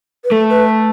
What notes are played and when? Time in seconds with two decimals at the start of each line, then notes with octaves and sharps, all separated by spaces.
0.24 B4
0.31 A3 A4
0.49 B4